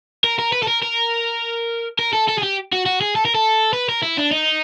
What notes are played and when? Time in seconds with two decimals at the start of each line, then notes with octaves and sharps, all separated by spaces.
0.24 A#4
0.39 A#4
0.53 B4
0.63 A4
0.67 A#4
0.82 A#4
1.99 A#4
2.13 A4
2.28 A4
2.38 G#4
2.43 G4
2.72 F#4
2.86 F#4
3.01 G#4
3.16 A4
3.25 A#4
3.35 A4
3.73 B4
3.89 A#4
4.03 E4
4.18 D4
4.32 D#4